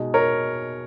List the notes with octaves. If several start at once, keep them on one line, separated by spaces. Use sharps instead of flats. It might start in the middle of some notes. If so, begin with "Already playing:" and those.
Already playing: B2 G#3 D#4
A#4 C#5